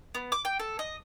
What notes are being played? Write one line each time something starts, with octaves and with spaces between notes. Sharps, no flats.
B3
D6
G5
A4
D#5